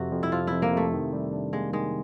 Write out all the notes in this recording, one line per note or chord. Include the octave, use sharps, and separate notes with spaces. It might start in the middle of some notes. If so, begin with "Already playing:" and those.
Already playing: F2 C3 F#4
F2
E4
F3 F4
F2 E4
A#3
C3 A3
D#3
G3
D4
G#3 A#3
D#3 G#3